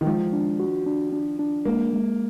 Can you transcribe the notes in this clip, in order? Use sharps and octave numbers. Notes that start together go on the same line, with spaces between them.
D#3
F3 G#3
D4
F#4
D4
D4
D4
G#3 A#3
G#3